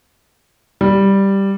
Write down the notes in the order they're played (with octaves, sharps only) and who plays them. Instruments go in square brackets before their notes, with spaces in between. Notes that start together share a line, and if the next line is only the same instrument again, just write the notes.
[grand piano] G3